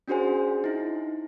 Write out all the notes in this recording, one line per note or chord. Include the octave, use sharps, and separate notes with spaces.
C#4 D4 F#4 G#4 C5 G#5
D#4 E4